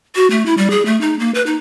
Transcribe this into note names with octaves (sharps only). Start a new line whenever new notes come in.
F#4
A3
E4
G3
G#4
A3
D#4
A#3
B4
D#4